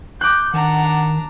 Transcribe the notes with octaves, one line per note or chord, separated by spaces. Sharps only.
D6 F#6 G6
D#3 D4 F#5 A#5